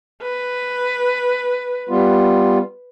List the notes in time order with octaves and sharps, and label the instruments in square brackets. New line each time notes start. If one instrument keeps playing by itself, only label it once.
[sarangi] B4
[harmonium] G3 B3 F4